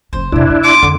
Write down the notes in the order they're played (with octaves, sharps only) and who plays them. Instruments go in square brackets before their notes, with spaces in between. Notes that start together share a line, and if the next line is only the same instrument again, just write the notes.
[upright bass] F#1 F#3 [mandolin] C5
[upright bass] F2 C3 [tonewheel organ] D4 E4
[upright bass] A#3
[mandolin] F4 A5 C6 [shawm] D6
[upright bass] F2 [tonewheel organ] D3